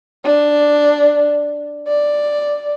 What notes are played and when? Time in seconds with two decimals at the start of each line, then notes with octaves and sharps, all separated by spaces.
0.25 D4
1.88 D5